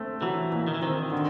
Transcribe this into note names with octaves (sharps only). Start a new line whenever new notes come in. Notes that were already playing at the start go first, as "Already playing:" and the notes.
Already playing: A3 C4
E3 F#3
A#2
D#3
E3
D#3 C4
D3